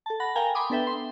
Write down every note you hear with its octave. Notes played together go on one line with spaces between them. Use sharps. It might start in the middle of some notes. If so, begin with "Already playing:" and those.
A4 A5
F#5 B5 A#6
A#4 F5 G5 G#5 A#5
G#5 B5 C6 D6 D#6
B3 D4 A4 B4 E5 G5
C6